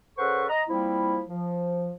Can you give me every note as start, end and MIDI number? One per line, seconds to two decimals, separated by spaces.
0.18 0.44 49
0.18 0.44 69
0.18 0.44 71
0.18 0.44 72
0.18 0.44 78
0.18 0.44 85
0.49 0.62 75
0.49 0.62 82
0.69 1.22 53
0.69 1.22 55
0.69 1.22 58
0.69 1.22 60
0.69 1.22 64
1.29 1.92 53